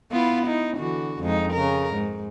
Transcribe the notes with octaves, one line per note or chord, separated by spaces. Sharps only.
B3 E4 F4
D#4 E4
D3 E3 F#4
F2 G#3 D#4
C#3 A#4
G#2